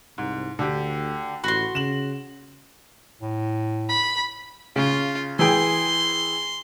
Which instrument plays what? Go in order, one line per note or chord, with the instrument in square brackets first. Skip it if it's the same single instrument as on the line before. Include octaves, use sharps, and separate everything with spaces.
[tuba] C2 [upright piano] G#2
[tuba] D2 [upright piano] D3 G4
[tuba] A1 [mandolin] F#4 C6 [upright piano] B5
[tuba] C#3 [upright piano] E7 F#7
[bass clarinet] A2
[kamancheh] B5
[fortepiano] C#3 [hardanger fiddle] F4
[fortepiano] E3 G#4 G5 [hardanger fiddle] C6